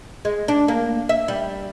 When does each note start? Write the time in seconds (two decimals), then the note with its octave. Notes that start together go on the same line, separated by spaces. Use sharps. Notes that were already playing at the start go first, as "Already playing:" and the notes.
0.25 G#3
0.48 D4
0.68 A#3
1.09 E5
1.28 G3